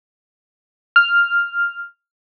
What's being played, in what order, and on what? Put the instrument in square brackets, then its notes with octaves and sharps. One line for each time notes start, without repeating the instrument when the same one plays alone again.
[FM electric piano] F6